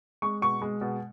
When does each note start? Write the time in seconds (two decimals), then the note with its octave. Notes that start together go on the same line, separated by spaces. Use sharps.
0.22 G#3 C#6
0.42 B2 C#6
0.61 G#3
0.81 B2